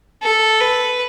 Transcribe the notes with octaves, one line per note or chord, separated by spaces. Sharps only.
A4
B4